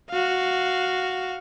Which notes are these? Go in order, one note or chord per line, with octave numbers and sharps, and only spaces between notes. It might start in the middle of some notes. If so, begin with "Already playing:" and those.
F#4 F5